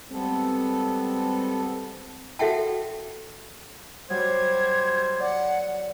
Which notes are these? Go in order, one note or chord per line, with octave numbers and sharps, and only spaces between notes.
G3 G#3 B3 C4 A4
F#4 A4 E5 F#5 G5 A5
F#3 G3 C5 G#6
D5 F#5